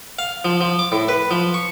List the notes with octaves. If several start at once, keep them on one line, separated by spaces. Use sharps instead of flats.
F5
F3
F3
D6
A2
B4
F3
C#6